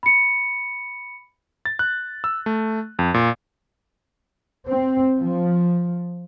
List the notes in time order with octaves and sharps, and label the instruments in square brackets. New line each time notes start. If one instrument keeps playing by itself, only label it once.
[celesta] B5 C#7
[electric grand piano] A6
F#6
E6
A3
F2
A#2
[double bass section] C4
F3